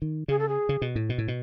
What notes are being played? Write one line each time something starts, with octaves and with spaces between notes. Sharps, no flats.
D#3
C#3 G#4
A4
G#4
C#3
B2
A2
B2
A2
B2